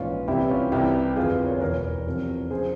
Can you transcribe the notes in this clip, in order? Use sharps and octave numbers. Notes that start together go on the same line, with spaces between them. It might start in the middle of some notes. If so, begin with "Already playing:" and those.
Already playing: A#1 G#2 E3 C#4 F4
C2 C3 E3 E4 G4
C#4 F4
C2 C3 E3 E4 G4
G1 F2 E3 F4 G#4
A#4 C#5
E1 E2 E3 A#4 C#5
E2 C3 F3
C#3 F3 G#4 C5